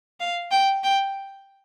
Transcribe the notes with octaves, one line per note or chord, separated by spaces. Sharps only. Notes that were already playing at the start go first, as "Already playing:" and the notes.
F5
G5
G5